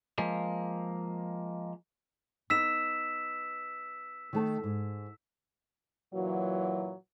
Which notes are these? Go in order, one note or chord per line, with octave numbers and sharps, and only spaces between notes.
F3 G#3 A#3
B3 D#4 E6 B6 E7
D#3 A3 A5
G#2
A#2 E3 F#3